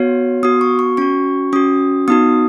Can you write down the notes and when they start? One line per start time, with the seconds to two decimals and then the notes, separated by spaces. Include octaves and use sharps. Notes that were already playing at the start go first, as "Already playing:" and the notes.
Already playing: B3 F#4 C#5
0.43 B3 F#4 D#6
0.61 C#6
0.79 C#6
0.97 C#4 F#4 C#6
1.53 C#4 F#4 D#6
2.08 B3 D#4 F#4 D#6